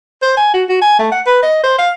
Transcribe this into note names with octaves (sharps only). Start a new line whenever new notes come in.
C5
G#5
F#4
F#4
G#5
A3
F#5
B4
D#5
C5
F5